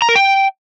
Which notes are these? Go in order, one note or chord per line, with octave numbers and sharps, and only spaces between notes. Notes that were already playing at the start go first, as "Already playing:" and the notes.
A#5
A#4
G5